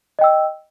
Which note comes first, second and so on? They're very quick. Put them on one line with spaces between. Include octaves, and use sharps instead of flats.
D#5 G5 E6